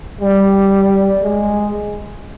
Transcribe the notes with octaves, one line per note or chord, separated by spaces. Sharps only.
G3
G#3